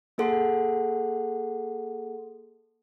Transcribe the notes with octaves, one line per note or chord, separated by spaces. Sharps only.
A#3 G#4 A4 F#5 C6